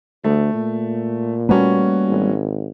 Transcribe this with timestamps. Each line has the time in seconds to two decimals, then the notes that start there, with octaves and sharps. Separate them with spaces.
0.24 D2 A3
0.54 A#2
1.49 G3 A3 A#3 C#4 F#4 B4
2.08 G#1